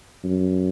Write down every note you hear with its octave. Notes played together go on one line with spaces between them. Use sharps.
F#2